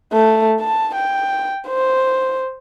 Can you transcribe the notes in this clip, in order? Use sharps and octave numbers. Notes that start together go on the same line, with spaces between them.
A3
A5
G5
C5